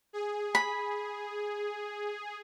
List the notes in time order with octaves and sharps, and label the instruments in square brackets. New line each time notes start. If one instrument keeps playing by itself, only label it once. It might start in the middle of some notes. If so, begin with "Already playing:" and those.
[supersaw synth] G#4
[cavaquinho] B5